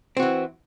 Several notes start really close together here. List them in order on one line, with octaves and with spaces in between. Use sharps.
C4 F#4 E3